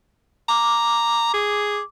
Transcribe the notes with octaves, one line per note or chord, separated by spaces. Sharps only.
A#5 D6
G#4